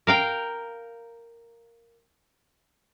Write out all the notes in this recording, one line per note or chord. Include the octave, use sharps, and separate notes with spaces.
A#4 F5 G5 A#5